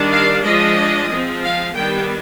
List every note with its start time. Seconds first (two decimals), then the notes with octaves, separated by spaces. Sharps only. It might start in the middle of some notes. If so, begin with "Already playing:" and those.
Already playing: D#3 G3 D4
0.12 F5
0.44 F3 G#3 D4 D#5
1.10 F3 G#3 C4
1.42 F5
1.74 D#3 G3 B3 D4 G5